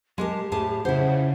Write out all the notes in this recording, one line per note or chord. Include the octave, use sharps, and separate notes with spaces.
G#3 G4 A#4 A5
A2 G#4 A5
C#3 E4 C5 F#5